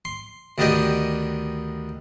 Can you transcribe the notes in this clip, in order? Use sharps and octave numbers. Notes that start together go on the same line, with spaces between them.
C6
D2 D#3 B3 D4 G4 D#5